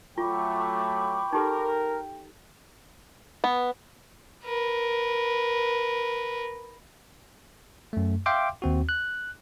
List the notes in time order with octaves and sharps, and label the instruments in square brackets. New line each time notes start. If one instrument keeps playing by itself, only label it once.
[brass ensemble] F#3 A3 [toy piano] F4 [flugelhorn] G5 [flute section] B5 C#6 D6
[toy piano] D#4 G4 A4 [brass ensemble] A#4
[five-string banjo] B3
[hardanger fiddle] A#4 B4
[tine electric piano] F#2 A3
E5 F5 G5 C6 D6
D#2 C4 F#4
F#6